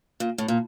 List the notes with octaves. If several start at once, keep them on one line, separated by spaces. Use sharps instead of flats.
A#2
A2
A#2